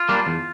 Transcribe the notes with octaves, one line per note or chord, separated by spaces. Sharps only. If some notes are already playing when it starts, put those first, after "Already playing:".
Already playing: F4
G3 A#3 D4
E2